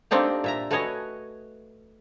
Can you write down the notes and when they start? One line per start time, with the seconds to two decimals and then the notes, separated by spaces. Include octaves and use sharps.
0.11 A3 A#3 C4 D4 D#4 G4
0.44 A#2 E5 A#5
0.71 A3 F#4 B4 C#5 D#5 G#5